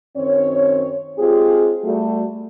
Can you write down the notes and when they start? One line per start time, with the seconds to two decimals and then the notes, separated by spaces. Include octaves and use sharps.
0.17 F#2 D#3 C4 C#5
1.18 G#3 C4 F4 G4 G#4
1.84 G3 A3 F#4